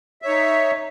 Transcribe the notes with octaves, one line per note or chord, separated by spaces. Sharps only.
D#4 C#5 E5